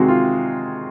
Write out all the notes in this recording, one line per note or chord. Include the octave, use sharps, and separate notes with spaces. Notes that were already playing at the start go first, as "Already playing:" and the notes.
Already playing: C3 D#3 G#3 C4 F#4 G#4
F4